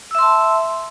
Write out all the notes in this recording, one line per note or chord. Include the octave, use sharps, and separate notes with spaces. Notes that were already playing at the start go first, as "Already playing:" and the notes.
E5 A5 C6 E6